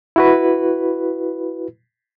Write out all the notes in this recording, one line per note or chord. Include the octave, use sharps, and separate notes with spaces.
E4 F#4 B4